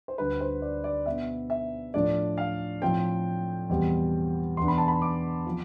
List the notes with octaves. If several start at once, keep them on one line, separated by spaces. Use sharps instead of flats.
C5
D2 D3 G3 B4
C5
D5
D5
B2 B3 D4 E5
E5
A2 F3 A3 D4 D5
F5
A2 F3 C4 G5
E2 B2 G3 C4
E2 B2 B3 D4 C6
B5
A5
B5
D6
F3 C4